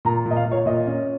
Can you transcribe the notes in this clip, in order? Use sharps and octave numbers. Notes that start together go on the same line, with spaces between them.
A#2 A#5
A#2
D#5
F5
A#2
C#5
A#2 D#5
C#4